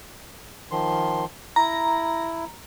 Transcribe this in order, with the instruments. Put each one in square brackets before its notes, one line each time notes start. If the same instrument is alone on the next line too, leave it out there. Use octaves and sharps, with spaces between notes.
[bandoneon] D#3 F3 C6
[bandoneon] E4 [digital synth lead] A#5